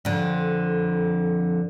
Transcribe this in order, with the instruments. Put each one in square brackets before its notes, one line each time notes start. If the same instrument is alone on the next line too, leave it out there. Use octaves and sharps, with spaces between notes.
[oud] F2 D3